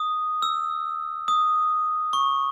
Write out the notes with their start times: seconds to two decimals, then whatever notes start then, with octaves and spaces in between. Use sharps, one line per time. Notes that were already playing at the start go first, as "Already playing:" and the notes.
Already playing: D#6
0.42 E6
1.28 D#6
2.13 C#6